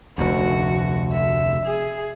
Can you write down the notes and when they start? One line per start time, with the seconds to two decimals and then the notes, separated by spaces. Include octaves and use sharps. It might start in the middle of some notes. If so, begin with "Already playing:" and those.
0.18 F1 D2 F#4
1.12 E5
1.66 G#4